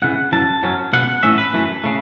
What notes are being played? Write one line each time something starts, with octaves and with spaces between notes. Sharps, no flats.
C#2 C#3 E3 F#5
F#2 E3 C#4 A5
F#2 F#3 C#4
C#2 B2 B3 F#5
A2 E3 A3 C#4 E5
B4
F#2 E3 A3
C#3 A3